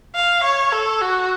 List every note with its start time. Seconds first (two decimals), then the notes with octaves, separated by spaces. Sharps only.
0.15 F5
0.44 C#5
0.72 A4
1.01 F#4